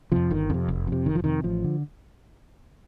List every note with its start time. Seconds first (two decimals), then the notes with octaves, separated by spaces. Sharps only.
0.12 F2 C3 F3
0.31 G1 D#3
0.50 F2 D3
0.54 C3
0.68 F1
0.87 F2 C3
1.06 F1 D#3
1.15 F3
1.24 F2 C3 D#3
1.44 A1 F3
1.64 D3